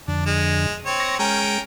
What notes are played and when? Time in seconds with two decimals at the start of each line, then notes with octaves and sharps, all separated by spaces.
0.08 F2 D3 D4
0.26 G#3
0.86 C4 C#5
1.00 C#6 A#6
1.19 G#3 C#4 A#4 G5